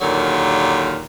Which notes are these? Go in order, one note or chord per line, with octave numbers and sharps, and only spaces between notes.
D#2 A#2 D3 F#3